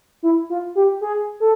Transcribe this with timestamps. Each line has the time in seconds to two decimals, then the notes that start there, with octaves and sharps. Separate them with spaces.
0.23 E4
0.50 F4
0.75 G4
1.01 G#4
1.40 A4